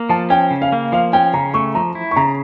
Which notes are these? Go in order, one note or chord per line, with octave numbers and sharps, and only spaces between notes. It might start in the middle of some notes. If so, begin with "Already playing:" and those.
Already playing: A#3
F3 A5
C#4 G5
C#3
F5
A#3
F3 F5
C#4 G5
C#3 A#5
A3 C#6
F3 A#5
E4
C#6
C#3 A#5